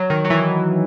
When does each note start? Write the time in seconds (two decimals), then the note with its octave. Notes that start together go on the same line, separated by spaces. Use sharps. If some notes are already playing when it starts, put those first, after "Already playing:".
Already playing: F#3
0.10 D#3
0.25 F#3
0.30 E3